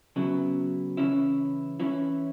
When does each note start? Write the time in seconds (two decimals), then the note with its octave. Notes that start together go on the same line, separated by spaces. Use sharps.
0.16 C#3 F#3 B3 E4
0.97 C#3 E3 C#4 E4
1.80 E3 C#4 E4